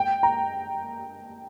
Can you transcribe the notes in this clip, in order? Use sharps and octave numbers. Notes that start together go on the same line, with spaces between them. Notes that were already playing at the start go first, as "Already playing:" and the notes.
Already playing: G5
A#5